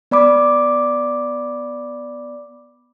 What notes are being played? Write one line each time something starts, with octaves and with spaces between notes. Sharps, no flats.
B3 D5 B5 D6